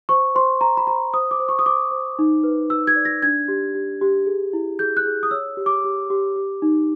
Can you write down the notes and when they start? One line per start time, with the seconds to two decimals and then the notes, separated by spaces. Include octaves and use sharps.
0.09 C5 C#6
0.35 C5 C6
0.61 C5 A#5
0.77 B5
0.87 C5 A#5
1.13 C5 D#6
1.31 D6
1.40 C5
1.49 C#6
1.59 D#6
1.66 C5 D6
1.91 C5
2.19 D#4
2.44 B4
2.70 B4 E6
2.87 G#6
2.96 D5
3.05 A#6
3.22 D4 G#6
3.48 G4
3.75 G4
4.01 G4
4.26 G#4
4.53 E4
4.79 G#4 G6
4.97 F#6
5.06 G#4
5.23 D#6
5.31 C#5 E6
5.57 G4
5.66 D6
5.84 G4
6.10 G4
6.36 G4
6.62 D#4